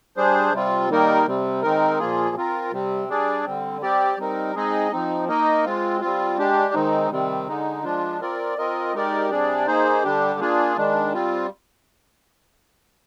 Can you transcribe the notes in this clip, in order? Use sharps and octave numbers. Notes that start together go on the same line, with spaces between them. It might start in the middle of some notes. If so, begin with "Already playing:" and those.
G3 D4 G#4 C5
C3 G3 C4 F4
D#3 G3 A#3 D#4 A#4
C3 G3 C4
D#3 G#3 C4 D#4 A#4
A#2 F3 A#3 F4 G#4
C4 F4 A#4
C3 G3 C4
G3 D4 G#4 D5
D3 G3 C4
G3 C4 G4 D5
G3 C4 D#4 A#4
G#3 C4 D#4 G#4 D#5
F3 C4 D#4
A#3 D#4 A#4 D#5
G#3 C4 F4
G3 C4 F4
G#3 D4 G4
D#3 G#3 C4 D#4
C3 D#3 G3 C4
D3 G#3 D#4
F3 G#3 D4 F4
C4 F4 A#4 D5
C4 F4 A#4 D#5
G#3 D#4 G4 A#4 D5
C3 G3 D4 G#4 D5
A#3 D#4 G#4 C5
D3 G3 D4 G4
A#3 D4 F4 G#4
D#3 G#3 D4
G3 C4 F4